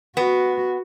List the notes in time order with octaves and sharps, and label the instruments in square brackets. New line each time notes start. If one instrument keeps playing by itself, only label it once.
[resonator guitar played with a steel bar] B3 [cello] F#4